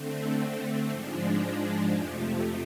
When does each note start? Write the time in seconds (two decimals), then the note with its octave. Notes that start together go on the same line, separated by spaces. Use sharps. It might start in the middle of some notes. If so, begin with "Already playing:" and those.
Already playing: D3 A3 C4
0.89 G#2 F3 G#3 D4
1.92 F2 C3 F3 A3